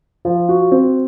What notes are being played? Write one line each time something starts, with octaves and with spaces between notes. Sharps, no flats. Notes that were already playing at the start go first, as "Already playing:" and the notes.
F3
F#4
C4